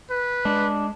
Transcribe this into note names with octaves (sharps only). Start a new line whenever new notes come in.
B4
G#3 D4